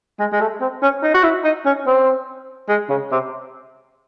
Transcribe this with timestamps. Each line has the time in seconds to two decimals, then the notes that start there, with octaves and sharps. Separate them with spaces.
0.19 G#3
0.32 G#3
0.40 A3
0.61 C4
0.82 C#4
1.03 D#4
1.14 F#4
1.23 E4
1.44 D#4
1.65 C#4
1.86 C4
2.69 G#3
2.89 C#3
3.11 C3